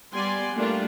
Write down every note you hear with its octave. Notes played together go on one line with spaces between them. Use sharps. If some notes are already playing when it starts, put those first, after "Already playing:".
G3 B3 D5 G#5 C6
G3 A3 A#3 D4 F4